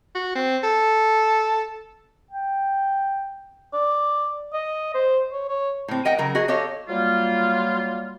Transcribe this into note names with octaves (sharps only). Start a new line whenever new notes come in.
F#4
C4
A4
G5
D5
D#5
C5
C#5
C#5
A2 C4
A#4 D#5 F#5 G5
C#3 F#3 A#4
F#4 G#4 D#5
G4 A4 C#5 D#5 F5
F#3 G3 A#3 F4